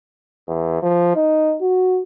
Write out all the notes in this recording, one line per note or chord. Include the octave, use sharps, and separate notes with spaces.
E2
F3
D#4
F#4